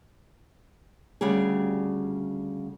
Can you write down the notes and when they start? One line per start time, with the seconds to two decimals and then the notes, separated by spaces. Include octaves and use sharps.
1.21 D2 C#3 G3 G4 G#4